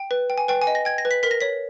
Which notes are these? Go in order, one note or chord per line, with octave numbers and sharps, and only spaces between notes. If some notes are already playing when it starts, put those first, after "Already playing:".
Already playing: G5
B4
G5
G#5
B4 G5
G#5
D#5
A#6
G5 G#6
A#6
B4
B6
A#4 B6
A#6
C#5 B6